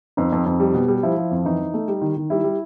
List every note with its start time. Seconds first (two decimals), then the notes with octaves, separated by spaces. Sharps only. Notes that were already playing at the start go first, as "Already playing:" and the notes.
0.17 F2 D#4
0.32 F2
0.46 F2
0.60 G3
0.74 B2
0.88 G3
1.03 F3 E4
1.17 F3
1.31 F2
1.45 E3 D#4
1.60 E3
1.74 A3
1.88 G3
2.02 D#3
2.17 D#3
2.30 G3 E4
2.44 G3